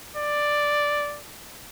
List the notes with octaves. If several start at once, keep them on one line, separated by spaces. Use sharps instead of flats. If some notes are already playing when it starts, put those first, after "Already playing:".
D5